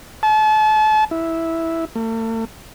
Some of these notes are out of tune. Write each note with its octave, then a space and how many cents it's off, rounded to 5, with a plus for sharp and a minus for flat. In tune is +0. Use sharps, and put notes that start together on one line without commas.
A5 -35
E4 -5
A3 +45